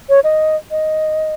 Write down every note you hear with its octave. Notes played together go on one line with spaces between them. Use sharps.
C#5
D#5
D#5